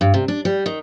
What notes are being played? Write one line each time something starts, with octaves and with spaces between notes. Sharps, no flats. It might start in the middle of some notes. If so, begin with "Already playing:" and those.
G2
C3
D4
G3
D#3